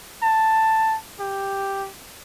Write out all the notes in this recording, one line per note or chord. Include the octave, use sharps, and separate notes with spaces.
A5
G4